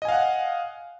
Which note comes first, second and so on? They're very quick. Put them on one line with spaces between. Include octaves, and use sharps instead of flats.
D#5 G#5 F5 F#5